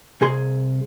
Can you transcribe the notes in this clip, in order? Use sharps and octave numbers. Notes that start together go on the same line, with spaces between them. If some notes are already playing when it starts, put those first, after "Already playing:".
C2 G#4 C6